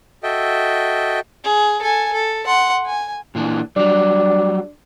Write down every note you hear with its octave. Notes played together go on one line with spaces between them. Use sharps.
F#4 A4 D#5 E5 G5
G#4
A4 G#5
A4
F#5 C6
G#5
A#2 E3 D4
F#3 G3 D4